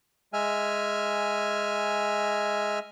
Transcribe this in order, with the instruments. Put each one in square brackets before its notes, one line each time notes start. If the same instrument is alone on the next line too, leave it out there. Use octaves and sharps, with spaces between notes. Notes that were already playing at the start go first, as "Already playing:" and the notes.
[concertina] G#3 E5 G#5 F6